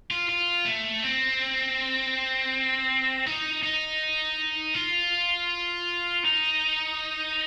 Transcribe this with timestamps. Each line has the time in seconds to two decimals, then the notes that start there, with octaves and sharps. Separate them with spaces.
0.11 F4
0.29 F4
0.66 A3
1.04 C4
3.27 D#4
3.63 D#4
4.75 F4
6.24 D#4